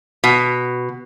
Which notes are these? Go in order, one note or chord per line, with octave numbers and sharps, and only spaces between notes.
B2